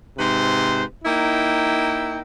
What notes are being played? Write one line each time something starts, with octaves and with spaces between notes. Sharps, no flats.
G#2 C3 B4 C5
A#3 D#4 E4 G5